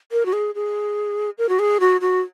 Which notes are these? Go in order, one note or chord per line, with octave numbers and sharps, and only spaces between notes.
A#4
F#4
G#4
G#4
A#4
F#4
G#4
F#4
F#4